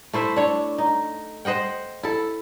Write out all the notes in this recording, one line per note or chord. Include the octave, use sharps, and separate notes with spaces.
A3 E4 C5 E5
D4 C#5
D#4
C5 D#5 F#5 G5
E4 A4